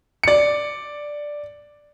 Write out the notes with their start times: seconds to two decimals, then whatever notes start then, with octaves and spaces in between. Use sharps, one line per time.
0.23 D5 C#7